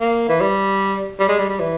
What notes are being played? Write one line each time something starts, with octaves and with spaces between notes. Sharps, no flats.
A#3
E3
G3
G3
G#3
G3
G3
E3